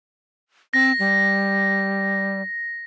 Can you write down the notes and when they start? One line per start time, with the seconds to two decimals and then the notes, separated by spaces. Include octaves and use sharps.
0.74 C4 A#6
0.99 G3